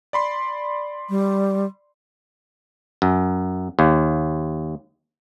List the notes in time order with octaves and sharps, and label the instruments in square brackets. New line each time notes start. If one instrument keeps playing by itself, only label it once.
[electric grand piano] D5 B5 C6
[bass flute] G3
[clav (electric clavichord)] F#2
D#2